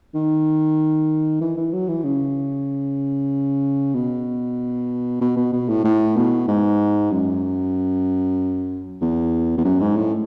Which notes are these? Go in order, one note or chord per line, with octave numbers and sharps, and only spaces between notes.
D#3
E3
E3
F#3
E3
C#3
B2
B2
B2
B2
A2
A2
B2
G#2
F#2
E2
E2
F#2
G#2
A2